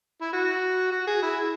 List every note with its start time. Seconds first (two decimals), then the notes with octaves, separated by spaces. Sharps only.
0.22 E4
0.33 F#4
0.92 F#4
1.07 G#4
1.23 E4